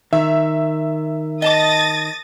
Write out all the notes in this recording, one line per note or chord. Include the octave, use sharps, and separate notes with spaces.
D#3 E5
D#5 A5 D6 D#6 A6 A#6